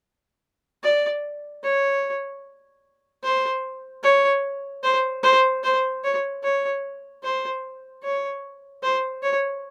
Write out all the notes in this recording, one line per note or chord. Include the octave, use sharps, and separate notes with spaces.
D5
C#5
C5
C#5
C5
C5
C5
C#5
C#5
C5
C#5
C5
C#5